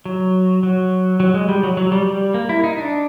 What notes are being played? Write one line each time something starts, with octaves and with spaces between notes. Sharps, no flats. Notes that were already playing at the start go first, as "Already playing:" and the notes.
F#3
F#3
F#3
G#3
G3
F#3
F#3
G3
G3
A#3
E4
D#4
D4